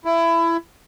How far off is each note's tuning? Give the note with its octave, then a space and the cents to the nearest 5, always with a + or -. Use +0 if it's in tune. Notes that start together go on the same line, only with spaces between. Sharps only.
E4 +20